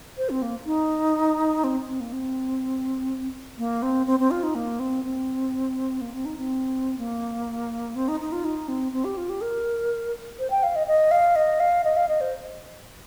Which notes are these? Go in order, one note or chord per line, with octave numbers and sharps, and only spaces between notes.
C5
C4
A#3
D#4
C4
C4
A#3
C4
A#3
C4
C4
C4
F4
D#4
A#3
C4
C4
A#3
C4
D#4
C4
A#3
C4
D#4
D#4
F4
D#4
C4
C4
G4
F4
G4
A#4
C5
G5
F5
D#5
D#5
F5
D#5
F5
D#5
F5
D#5
C5